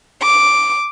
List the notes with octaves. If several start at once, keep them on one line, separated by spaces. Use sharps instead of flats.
D6